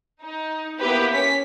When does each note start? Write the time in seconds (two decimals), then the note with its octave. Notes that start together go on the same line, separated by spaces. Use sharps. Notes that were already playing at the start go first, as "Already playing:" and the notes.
0.23 D#4
0.80 A#3 B3 E4 G4 B4
1.12 C#4 B6